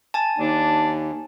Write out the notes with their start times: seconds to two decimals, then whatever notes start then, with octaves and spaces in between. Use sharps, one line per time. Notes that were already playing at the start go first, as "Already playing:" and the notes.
0.14 G#5 A5
0.38 D#2 D4 D#4